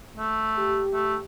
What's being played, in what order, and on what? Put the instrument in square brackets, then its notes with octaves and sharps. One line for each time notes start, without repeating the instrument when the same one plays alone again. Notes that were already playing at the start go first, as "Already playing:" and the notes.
[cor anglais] A3
[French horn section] G4
[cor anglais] A3